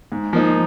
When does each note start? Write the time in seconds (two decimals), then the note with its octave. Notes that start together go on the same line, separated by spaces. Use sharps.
0.12 G#2
0.33 F3 A#3 D#4